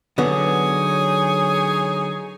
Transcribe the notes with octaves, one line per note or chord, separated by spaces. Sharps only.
D3 F#3 B3 D#4 G#4 C#5